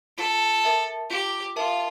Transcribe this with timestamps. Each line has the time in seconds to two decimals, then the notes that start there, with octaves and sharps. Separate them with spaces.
0.17 F4 A4
0.64 A#4 E5 A5
1.10 F4 G4
1.56 F4 A#4 E5 A5